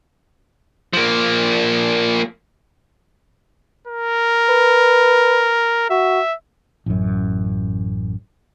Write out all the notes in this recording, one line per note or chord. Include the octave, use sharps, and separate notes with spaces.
F3 A#3
A#4
B4
F#4 E5
A1 F#2